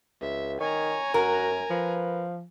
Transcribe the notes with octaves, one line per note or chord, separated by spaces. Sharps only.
C#2 E5
D#3 C#5 G#5 A#5
F#2 F#4 A#4
F3 B4